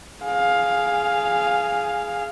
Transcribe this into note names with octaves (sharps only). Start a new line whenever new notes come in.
G#4 F5